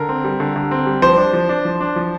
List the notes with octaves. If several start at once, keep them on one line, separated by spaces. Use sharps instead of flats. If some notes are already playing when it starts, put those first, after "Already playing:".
Already playing: D3 A#4
C4
G3
D3
D3
C4
G3
F3 C5
D4
F3
D4
F3
D4
F3